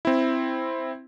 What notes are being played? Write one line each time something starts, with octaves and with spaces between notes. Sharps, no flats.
C4 E4